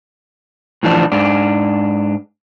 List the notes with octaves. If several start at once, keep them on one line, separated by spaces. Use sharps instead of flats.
A2 E3 F3 D4
G#2 D4